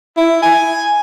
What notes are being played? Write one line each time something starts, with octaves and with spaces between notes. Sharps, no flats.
E4
G#5